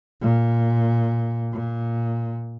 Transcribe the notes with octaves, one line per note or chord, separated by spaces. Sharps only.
A#2
A#2